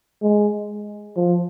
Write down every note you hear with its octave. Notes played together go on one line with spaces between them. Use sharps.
G#3
F3